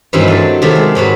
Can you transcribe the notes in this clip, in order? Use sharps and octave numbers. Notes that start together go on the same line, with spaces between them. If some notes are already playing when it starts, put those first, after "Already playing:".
G2 D#3 E3 F#3 C4 E4
A3 D4 A4
C3 D#3 F#3 A3
G#3
G#2 F#3 F#4 B4